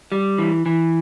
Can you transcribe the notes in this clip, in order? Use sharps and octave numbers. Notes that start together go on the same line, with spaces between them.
G3
E3
E3